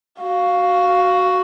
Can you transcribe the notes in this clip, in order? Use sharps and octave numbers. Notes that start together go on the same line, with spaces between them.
F#4 F5